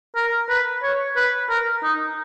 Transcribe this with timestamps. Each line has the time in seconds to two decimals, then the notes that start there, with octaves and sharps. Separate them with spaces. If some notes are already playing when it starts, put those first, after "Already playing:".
0.16 A#4
0.49 B4
0.83 C#5
1.16 B4
1.49 A#4
1.83 D#4